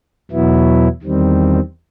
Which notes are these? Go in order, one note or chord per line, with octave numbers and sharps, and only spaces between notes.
E2 B2 F#3 B3 E4
E2 D#3 G3 C4